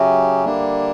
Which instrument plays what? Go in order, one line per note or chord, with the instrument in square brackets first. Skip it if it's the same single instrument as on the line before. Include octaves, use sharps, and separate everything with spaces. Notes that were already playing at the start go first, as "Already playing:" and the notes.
Already playing: [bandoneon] C#3 F#3 C#4 G4 [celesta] E5
[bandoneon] D3 G3 A#3 D4